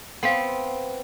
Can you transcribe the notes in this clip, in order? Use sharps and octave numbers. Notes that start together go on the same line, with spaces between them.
B3 C4 F5 F#5